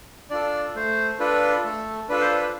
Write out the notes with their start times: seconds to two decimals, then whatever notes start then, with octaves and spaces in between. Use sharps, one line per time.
0.30 D4 F4 A4 D5
0.75 A3 C5
1.19 D4 F4 A4 B4
1.64 A3 A4
2.09 D4 F4 A4 B4
2.21 C5
2.32 B4